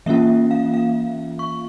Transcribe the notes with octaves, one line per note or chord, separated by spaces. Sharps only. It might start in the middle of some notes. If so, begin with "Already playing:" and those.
E3 A#3 C#4 F4 E5
F5
F5
C#6